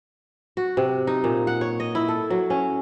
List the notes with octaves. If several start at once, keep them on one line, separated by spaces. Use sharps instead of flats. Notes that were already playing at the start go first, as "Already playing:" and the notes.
F#4
C3
D#4
A#2
F#5
C#5
D#5
E4
A4
F#3
C#4